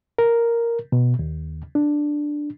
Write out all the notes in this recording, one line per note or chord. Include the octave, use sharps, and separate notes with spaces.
A#4
B2
D#2
D4